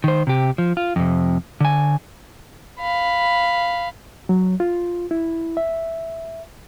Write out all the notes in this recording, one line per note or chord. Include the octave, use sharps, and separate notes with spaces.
D#3 C5
C3 G4
F3
F4
F2 C3
D3 G#5
F5 B5
F#3
F4
E4
E5